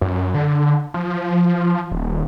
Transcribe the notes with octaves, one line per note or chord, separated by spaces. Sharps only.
F#2
D3
F3
D#1